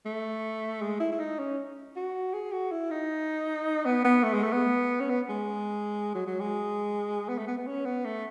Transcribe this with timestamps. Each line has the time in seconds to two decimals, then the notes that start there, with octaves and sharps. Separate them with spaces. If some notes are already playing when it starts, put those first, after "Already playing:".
0.06 A3
0.82 G#3
1.00 E4
1.12 E4
1.20 D#4
1.39 C#4
1.96 F#4
2.34 G#4
2.52 F#4
2.72 E4
2.91 D#4
3.85 B3
4.05 B3
4.24 A3
4.33 G#3
4.43 A3
4.53 B3
5.00 C#4
5.10 B3
5.29 G#3
6.15 F#3
6.27 F#3
6.40 G#3
7.29 B3
7.38 A3
7.48 B3
7.58 B3
7.67 C#4
7.86 B3
8.05 A3